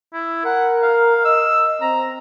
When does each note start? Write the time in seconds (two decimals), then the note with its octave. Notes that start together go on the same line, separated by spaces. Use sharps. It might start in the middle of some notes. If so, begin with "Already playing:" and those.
0.13 E4
0.45 A#4 F#5
0.82 F5
1.25 D#5 E6
1.81 C4 A#5